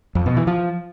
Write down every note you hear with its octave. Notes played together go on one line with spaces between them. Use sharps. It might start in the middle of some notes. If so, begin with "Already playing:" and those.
F2
B2
E3
F3